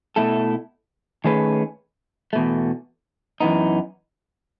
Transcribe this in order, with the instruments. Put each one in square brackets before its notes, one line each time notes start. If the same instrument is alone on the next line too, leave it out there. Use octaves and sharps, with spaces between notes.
[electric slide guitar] B2 A3 E4 A4
D#3 A3 C#4 G#4 B4
E2 B2 A3
F#2 E3 B3 D#4